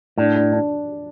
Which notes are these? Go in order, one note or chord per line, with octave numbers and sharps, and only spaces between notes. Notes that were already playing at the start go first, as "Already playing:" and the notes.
A2 D4
D4
D4